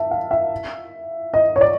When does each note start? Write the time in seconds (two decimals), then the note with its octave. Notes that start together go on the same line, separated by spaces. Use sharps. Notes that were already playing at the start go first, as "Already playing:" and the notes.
Already playing: E5 A5
0.11 F5
0.31 E5
1.34 D#5
1.56 C#5
1.61 D5